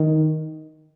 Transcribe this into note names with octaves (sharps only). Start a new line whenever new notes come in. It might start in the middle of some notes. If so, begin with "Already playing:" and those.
Already playing: D#3